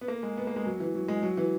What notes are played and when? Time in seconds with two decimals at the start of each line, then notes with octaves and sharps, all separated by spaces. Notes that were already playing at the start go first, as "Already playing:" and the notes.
0.01 B3
0.08 A#3
0.23 G#3
0.37 B3
0.47 A#3
0.56 G#3
0.66 F#3
0.80 E3
0.95 F#3
1.08 G#3
1.23 F#3
1.37 E3